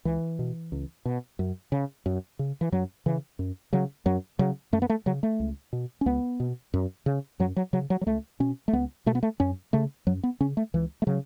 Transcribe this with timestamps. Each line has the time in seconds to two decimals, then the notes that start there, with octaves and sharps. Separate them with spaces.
0.05 C#2 E3
0.39 B2
0.72 C#2
1.05 B2
1.39 F#2
1.72 C#3
2.06 F#2
2.39 C#3
2.61 E3
2.72 F#2 F#3
3.06 C#3 E3
3.39 F#2
3.73 C#3 F#3
4.06 F#2 F#3
4.39 C#3 F#3
4.73 F#2 A3
4.82 B3
4.90 A3
5.06 C#3 F#3
5.23 A3
5.40 C#2
5.73 B2
6.01 C#4
6.06 C#2 B3
6.40 B2
6.74 F#2
7.06 C#3
7.40 F#2 F#3
7.56 F#3
7.73 C#3 F#3
7.90 F#3
8.01 F#3
8.06 C#2 A3
8.40 B2 C#4
8.68 A3
8.73 C#2 B3
9.06 B2 A3
9.15 B3
9.23 A3
9.40 F#2 C#4
9.73 C#3 A3
10.07 F#2 F#3
10.23 B3
10.40 C#3 C#4
10.57 A3
10.74 C#2 E3
11.02 A3
11.07 C#3 F#3